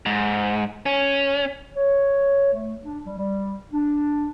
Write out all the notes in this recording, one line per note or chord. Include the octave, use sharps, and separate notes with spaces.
G#2
C#4
C#5
A3
D4
G3
G3
D4